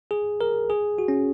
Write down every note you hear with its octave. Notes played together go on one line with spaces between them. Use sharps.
G#4
A#4
G#4
F#4
C#4